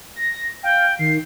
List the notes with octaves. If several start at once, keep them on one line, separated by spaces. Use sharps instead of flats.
A#6
F5 G5
D#3 C7